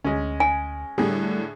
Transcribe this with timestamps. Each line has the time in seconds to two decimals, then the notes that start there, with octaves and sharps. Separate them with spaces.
0.04 D2 G#3 C#4
0.40 G#5
0.98 A2 D3 G3 G#4